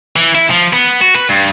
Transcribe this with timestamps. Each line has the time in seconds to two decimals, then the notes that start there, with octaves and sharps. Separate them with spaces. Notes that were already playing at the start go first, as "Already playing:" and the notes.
0.16 E3
0.35 E4
0.50 F3
0.73 B3
1.01 F#4
1.15 B4
1.29 G2